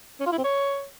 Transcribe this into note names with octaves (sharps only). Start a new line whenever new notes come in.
C#4
F4
E4
C4
C#5